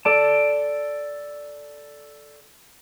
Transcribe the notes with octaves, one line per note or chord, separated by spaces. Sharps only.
A4 D5 A5